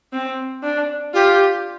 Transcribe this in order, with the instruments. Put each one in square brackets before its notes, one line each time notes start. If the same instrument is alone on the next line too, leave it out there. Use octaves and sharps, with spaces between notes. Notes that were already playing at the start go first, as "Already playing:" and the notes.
[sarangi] C4
D4
[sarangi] F4 [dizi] G4